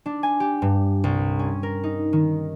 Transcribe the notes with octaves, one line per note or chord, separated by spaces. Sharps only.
D4
G#5
G4
G2
C2
C#4
A#4
D#4
D#3